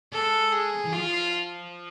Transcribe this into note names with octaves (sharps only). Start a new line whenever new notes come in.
G#3 A4
G#4
E3
F3 F4